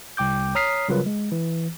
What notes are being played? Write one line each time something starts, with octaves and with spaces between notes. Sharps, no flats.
C2 G5 D6 G6
C#5 A#5 D#6 F6 B6 C7
C#3 F#3 G3 F4 A#4 B4
G#3
E3